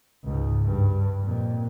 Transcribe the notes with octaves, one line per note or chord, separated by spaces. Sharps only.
C#2 G#2
G2
F2 A#2